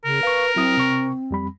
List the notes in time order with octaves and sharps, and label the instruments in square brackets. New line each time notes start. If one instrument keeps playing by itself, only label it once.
[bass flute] C#3 [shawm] A#4
[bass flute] B4 [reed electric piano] F5 C#6
[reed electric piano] F#3 E4 D#6 [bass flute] C4
[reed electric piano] C3 C#6
F2 G3 B5